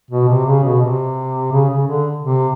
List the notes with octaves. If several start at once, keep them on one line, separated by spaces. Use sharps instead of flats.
B2
C3
C#3
B2
C3
C#3
C#3
D3
C3